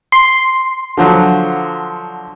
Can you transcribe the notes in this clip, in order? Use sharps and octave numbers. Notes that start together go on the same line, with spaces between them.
C6
D3 F3 F#3